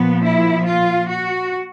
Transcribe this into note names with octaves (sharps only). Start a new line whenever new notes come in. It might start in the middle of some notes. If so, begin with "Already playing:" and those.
Already playing: A#2 F3 B3
E4
F4
F#4